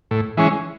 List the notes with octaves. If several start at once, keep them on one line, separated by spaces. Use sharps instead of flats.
A2
E3 G#3 C#4